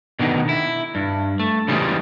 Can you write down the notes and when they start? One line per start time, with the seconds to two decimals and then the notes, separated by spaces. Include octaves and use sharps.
0.19 B2 D3 D#3
0.49 E4
0.95 G2
1.40 A3
1.68 C#3 E3 G3 G#3